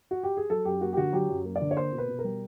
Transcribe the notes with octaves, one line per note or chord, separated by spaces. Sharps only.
F#4
G4
G#4
F#3 A4
F#2 G4
A#3 F#4
G4
D3 F#4
F#3 G4
F#2
A#3
D5
D3
C#5
A#3 C5
B2
B4
B2
A#4
G3